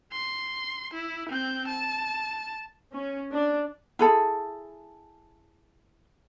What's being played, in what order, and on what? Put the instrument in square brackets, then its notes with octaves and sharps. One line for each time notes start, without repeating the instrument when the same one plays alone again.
[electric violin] C6
E4
C4 G6
A5
[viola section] C#4
D4
[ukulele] E4 G#4 A4